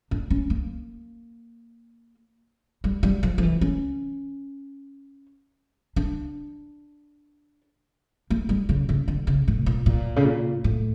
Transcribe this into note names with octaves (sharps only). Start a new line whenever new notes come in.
D4
C#4
A#3
G3
G3
F3
F3
E3
C#4
D4
A#3
G3
C#3
C#3
D3
C#3
A2
A#2
A#2
C#3
A#2
A2